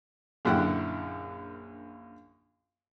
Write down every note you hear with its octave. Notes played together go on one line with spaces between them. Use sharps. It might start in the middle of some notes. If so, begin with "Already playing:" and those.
A#1 F#2 D3 E4 F#5 G5